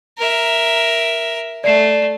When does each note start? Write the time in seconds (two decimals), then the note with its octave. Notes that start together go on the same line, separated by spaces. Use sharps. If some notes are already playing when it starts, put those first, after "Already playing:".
0.18 A#4 E5
1.64 A3 D5 C7 E7